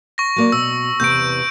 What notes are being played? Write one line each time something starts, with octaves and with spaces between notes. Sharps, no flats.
C#6 A#6
F#3 A#3 D5
B2 E6
E2 C3 B3 G6 D7